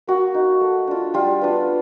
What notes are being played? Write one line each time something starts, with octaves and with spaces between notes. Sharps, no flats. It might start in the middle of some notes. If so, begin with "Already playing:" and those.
A#3 F#4
D#4
A3
D4 F4
G3 F4
B3 D4 F4